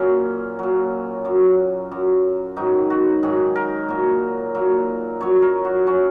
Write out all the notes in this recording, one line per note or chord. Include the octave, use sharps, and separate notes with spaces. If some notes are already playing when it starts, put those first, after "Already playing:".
Already playing: A#2 F#3 C#4
A#2 F#3
F#2 F#3
F#2 F#3
G#2 D#3 F#3 D#4
F#4
G#2 D#3 F#3 G#4
A#4
A#2 F#3
A#2 F#3
F#2 F#3 C#5
A#4
F#4
F#3 C#4